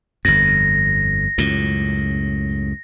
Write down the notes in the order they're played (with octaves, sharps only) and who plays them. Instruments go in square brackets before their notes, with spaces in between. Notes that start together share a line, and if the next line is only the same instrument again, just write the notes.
[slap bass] G1 F2 [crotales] A#6
[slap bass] C#2 F#2 A2